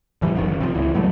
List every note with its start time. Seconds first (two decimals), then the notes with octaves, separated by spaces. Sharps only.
0.22 A1 E3 G3
0.36 F1 F#2 D#3
0.47 G1
0.61 C3 F3
0.74 C#2 E3
0.94 G2 F#3 G3 A3